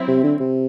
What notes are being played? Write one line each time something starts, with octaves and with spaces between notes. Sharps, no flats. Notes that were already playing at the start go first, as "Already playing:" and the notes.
Already playing: F#3 C4 E4
C3
D3
C3